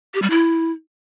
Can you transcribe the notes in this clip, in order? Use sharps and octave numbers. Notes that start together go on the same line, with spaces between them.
G4
G3
E4